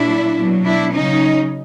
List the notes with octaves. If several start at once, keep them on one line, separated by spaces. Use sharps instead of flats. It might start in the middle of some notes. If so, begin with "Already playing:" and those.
Already playing: A#2 F#3 D4 E4
B2 F#3
D4 E4
C#3 F#3 C#4 D#4